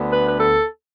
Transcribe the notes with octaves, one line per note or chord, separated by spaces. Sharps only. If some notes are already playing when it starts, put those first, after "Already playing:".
Already playing: D2 D3 B3
B4
B4
A4